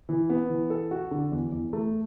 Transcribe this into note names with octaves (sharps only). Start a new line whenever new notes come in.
E3
B3
E3
A4
F#4
D3
E2
E2
A3